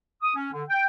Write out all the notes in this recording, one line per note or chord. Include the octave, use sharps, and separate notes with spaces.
D#6
C#4
D3
G5